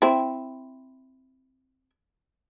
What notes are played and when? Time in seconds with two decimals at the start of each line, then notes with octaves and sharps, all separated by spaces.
0.02 C4 E4